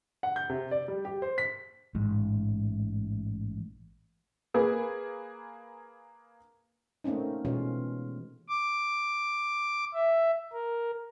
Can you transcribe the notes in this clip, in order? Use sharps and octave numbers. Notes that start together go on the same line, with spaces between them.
F#5
G6
C3
D5
G3
G4
C5
B6
A1 G#2
A#3 G#4 B4
A3 A#3 C4 C#4 D#4
B2 E3 G#3 C#4 F4
D6
E5
A#4